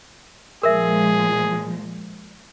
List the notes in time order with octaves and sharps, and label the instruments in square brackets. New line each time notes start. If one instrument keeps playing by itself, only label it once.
[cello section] A#2 F3 G#3 [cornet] G#4 [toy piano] A#4 E5